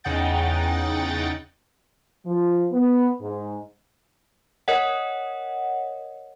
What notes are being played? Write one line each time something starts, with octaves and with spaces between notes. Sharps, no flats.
E2 C#3 D#4 F#5 G5 A6
F3
B3
G#2
A#4 C#5 D#5 F#5